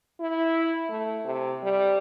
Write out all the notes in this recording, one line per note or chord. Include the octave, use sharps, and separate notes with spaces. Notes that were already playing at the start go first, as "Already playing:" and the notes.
E4
A3
C3
G3